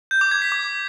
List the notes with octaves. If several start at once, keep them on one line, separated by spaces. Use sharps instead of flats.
G6
D6
G#6
B6
D6